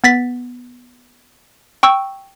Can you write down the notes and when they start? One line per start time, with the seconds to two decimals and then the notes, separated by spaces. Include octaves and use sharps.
0.04 B3 A6 B6
1.83 G5 C#6 E6